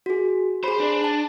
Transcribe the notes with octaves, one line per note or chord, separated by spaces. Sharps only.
F#4 G#4
G#4 C5 B5
D4
A5